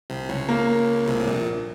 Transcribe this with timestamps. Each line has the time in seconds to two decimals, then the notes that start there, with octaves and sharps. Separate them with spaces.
0.10 C2 C3
0.29 C#2 C#3
0.49 A#3
1.08 C2 C3
1.20 A2
1.27 A#1 A#2